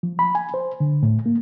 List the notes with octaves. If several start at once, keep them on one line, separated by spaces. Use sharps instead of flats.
F3
B5
G#5
C5
D3
A2
A#3